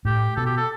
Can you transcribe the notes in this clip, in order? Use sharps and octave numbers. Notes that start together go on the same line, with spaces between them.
A2 G4
B2 A4
G4
A4